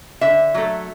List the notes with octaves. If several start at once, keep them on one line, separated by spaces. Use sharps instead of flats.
D3 E5
F#3 A3